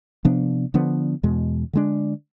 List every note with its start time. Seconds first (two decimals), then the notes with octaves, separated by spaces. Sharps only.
0.25 C3 F3 B3 D4
0.74 D3 F3 B3 D4
1.23 E2 B2 G#3
1.73 D3 G#3 D4